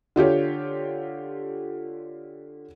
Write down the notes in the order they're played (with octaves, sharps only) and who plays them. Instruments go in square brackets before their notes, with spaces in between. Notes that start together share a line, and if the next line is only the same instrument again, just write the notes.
[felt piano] D3 F4 G4 C#5